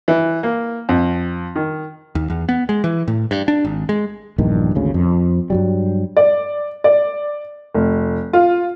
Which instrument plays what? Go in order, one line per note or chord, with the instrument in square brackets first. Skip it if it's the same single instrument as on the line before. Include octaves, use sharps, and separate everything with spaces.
[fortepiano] E3
A#3
F2
D#3
[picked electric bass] D#2
E2
B3
G#3
E3
A2
G2
D4
G#1
G#3
[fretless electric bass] A#1 E2 G2 D#3
G#1 D2 C#3
F2
G2 F#3 G3
[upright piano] D5
D5
F1
F4